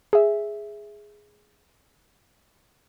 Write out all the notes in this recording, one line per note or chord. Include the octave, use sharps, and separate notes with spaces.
G#4 E5